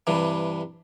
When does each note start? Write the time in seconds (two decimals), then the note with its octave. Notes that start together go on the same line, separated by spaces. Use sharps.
0.07 G2 C3 E3